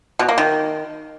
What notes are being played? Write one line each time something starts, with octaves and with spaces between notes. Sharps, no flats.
B2
A#3
D#3